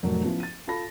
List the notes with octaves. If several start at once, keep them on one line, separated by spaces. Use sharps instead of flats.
F1 A2 F#3 A#4
F3 B3 C#4 E4
A6 D#7
F4 A4 A5 B5 A#6